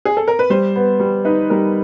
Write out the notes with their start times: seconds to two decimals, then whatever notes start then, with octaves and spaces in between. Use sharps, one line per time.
0.05 G#4
0.17 A4
0.28 A#4
0.39 B4
0.50 G3 C5
0.76 B3
1.00 G3
1.25 D#4 B4
1.50 G3 A#4